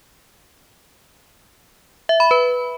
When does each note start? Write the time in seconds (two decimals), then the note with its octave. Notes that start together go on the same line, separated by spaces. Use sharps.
2.09 E5
2.20 B5
2.31 B4